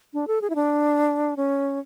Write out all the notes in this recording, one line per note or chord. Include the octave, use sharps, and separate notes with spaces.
D4
A4
G#4
E4
D4
C#4